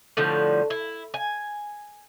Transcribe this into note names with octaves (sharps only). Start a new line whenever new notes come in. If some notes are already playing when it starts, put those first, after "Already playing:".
A2 D3 F3 G3
E4
G#5